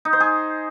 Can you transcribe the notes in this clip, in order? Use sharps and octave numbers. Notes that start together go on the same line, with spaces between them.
D#4
C5
G#4